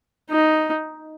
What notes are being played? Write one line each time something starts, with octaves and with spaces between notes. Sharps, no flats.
D#4